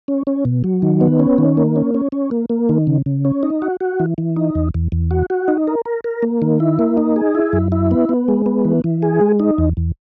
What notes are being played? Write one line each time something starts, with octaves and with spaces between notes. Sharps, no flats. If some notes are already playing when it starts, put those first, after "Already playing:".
C#4
C#4
B2
F#3
D#3
B3
C#4
D#3
A#3
C#4
C#4
C#4
A#3
A#3
D#3
C#3
C#3
C#4
D#4
F#4
F#4
E3
E3
D#4
E2
E2
E2
F#4
F#4
D#4
A#4
A#4
A#4
A#3
D#3
E4
A#3
D#4
G#4
E4
F#2
E4
B3
B3
G#3
B3
E3
E3
G#4
G#3
D#4
E2
E2